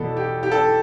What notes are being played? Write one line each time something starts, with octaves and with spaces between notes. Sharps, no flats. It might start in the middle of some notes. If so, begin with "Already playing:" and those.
Already playing: E2 B2 B3 A4
G4
G4
A4